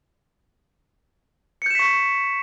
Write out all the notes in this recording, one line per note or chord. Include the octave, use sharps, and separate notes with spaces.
C#6 G6 B6 C#7 E7